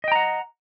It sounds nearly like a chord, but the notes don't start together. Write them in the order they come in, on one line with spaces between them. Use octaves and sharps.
D#5 G5 A#5 F#5